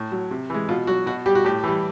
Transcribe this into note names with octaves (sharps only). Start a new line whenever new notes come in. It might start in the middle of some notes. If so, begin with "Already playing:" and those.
Already playing: A2
F#3
C3
E3 G#3
B2 F4
F#3 F#4
B2 F#4
G3 G4
F#4
A2 G4
E3 G3